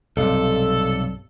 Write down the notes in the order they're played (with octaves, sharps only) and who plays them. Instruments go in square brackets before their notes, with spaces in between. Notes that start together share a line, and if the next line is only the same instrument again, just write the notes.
[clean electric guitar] B1 G2 C3 [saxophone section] A4